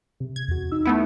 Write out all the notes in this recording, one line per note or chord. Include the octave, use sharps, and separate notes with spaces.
C3
G#6
E2 F#4
D#4 E6
A3 B3 E4